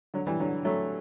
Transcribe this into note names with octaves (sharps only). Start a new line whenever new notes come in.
D3 F#3
E3 G3
D3 F#3
F#3 A3